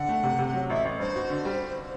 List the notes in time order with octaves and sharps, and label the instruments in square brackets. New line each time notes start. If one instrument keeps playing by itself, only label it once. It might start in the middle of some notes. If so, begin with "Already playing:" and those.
Already playing: [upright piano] D3 [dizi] F#5
[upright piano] A3
C3
C3
F#3
[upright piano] A1 [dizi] E5
[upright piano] A1
[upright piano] G2 [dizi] C5
[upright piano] F#4
D3
G3